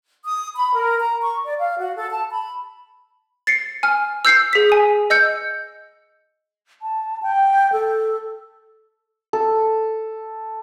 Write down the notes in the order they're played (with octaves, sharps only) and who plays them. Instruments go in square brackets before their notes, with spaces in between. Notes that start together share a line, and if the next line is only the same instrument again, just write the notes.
[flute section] D#6
B5
A#4
A#5
C#6
D5
F5
F#4
A4
A5
B5
[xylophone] A6 C7 C#7
G#5 F6
E6 G6 C7 C#7
G#4 B6
G#5 D#6
D#5 E6 G6 C#7
[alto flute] A5
G5
A4
[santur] A4